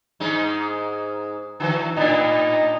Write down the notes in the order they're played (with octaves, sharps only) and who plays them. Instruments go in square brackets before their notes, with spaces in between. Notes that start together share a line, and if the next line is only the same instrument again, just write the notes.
[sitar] G#2 G#3 D#4
D3 E3 F#3
[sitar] A2 B3 D4 [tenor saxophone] D#4